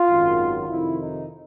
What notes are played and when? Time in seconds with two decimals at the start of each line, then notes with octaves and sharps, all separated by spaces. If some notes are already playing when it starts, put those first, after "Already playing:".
Already playing: F4
0.08 G#1 F#2 D#3 F#3
0.68 F2 C3 D#3 E4
0.99 D#4